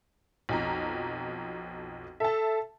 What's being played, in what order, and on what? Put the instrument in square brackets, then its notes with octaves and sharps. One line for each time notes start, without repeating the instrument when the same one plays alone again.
[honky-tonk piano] B1 F2 A#5
[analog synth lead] A4 [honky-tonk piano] E5 A5